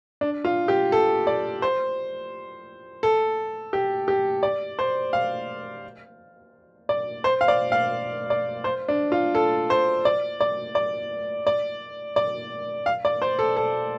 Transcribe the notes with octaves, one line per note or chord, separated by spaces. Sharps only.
D4
F4
G4
A4
D5
C5
A4
G4
G4
D5
C5
F5
D5
C5
F5
D5
F5
D5
C5
D4
F4
A4
C5
D5
D5
D5
D5
D5
F5
D5
C5
A4
A4